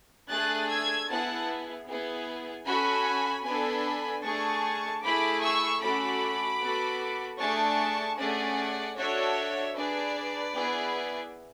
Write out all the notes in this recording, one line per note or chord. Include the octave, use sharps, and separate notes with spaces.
A3 D4 G#4 F#6 A6
E6 G#6
B3 E4 G#4 F#5 A5
B3 E4 G#4
C#4 F#4 A4 G#5 B5
B3 D4 A4 G#5 B5
A3 D4 G#4 A5 C#6
A3 E4 G#4 B5 D6
C#6 E6
A3 C#4 F#4 A4 B5 D6
B3 F#4 A4
A3 D4 G#4 A5 C#6
A3 C#4 G#4 D5 F#5
D4 F#4 A4 C#5 E5
D4 G#4 B4 D5
B3 E4 G#4